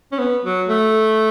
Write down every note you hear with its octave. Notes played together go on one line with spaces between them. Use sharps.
C#4
B3
F#3
A3